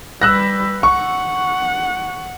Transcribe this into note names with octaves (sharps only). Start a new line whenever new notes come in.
G3 B4 E6 F#6 A#6
F#5 C#6